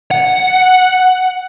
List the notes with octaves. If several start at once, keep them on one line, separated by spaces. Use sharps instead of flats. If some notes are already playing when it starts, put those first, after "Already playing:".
F#5